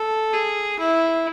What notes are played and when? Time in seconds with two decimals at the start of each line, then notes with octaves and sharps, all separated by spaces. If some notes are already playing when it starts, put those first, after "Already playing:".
Already playing: A4
0.33 G#4
0.79 E4